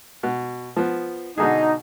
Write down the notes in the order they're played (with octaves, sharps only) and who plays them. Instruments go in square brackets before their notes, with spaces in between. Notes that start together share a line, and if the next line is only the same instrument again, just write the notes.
[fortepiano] B2
F3 B3
[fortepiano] B2 D3 G#4 [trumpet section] D#4